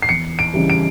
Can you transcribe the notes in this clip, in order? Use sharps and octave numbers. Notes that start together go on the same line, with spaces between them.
C7
E2 C#7
D7
C#3 E3 G3
D7